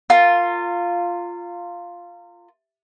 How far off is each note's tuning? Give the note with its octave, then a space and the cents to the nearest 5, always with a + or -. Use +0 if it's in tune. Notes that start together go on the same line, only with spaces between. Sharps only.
F4 +0 A#4 -30